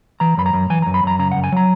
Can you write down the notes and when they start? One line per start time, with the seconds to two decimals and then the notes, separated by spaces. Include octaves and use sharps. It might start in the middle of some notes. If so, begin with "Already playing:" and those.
0.20 E3 A#5
0.37 F#2 B5
0.46 A#5
0.53 F#2
0.70 E3 G#5
0.82 A#5
0.86 F#2
0.94 B5
1.04 F#2 A#5
1.19 C#3 A#5
1.32 F#5
1.37 F#2
1.44 G#5
1.52 F#3 A#5